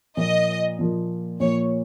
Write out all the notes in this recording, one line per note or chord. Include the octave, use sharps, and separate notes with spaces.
A#2 F3 A#3 D#5
A#2 F3 A#3
A#2 F3 A#3 C#5